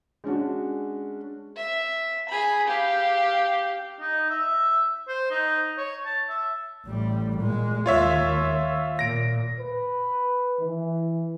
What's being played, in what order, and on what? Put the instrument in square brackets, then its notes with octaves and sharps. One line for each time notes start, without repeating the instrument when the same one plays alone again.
[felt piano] G#3 C#4 D4 F#4
[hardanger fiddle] E5
G#4 B5
G4 F5
[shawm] D#4
E5
C5
D#4
C#5
A5
E5
[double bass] A1 G3
A#2 G#3
[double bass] D#2 [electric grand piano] F4 C#5 E5
[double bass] A#2 [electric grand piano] A#6 D7
[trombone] B4
E3